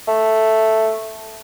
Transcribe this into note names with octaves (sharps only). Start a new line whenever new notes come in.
A3